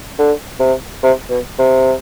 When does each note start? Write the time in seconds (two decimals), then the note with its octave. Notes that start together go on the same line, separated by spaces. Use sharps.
0.19 D3
0.60 C3
1.03 C3
1.30 B2
1.59 C3